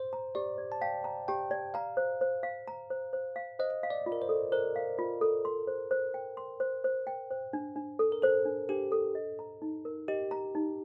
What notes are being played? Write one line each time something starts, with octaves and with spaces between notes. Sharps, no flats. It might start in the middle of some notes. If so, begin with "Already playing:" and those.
Already playing: C5
A#5
G4 D5
D5
A5
F5 G5
A#5
G4 G5
D5
F5 A#5
C5
C5
F5
A#5
C5
C5
F5
C5 D#5
F5
D5
F4
A#4
C5
A4
A#4 C5
F5
F4
A4
C6
C5
C5
G5
C6
C5
C5
G5
C5
D4
D4
A4
A#4
A4 C5
D4
D4 G4
A4
D#5
A#5
D#4
A#4
G4 D#5
A#5
D#4